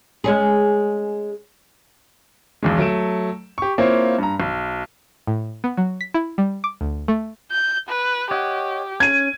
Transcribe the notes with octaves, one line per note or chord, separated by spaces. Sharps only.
G#3 C#4 G#4
B1 E2 G#3
F#3 A3 D7 E7
G4 C#6
A#3 C4 E4 F4 C5 C#5
G2 A#5
B1
A2
B3
F#3
B6
E4
G3
D6
D2
A3
G6
B4
G4 C#5 D#5 F#5
C#4 G#6 D#7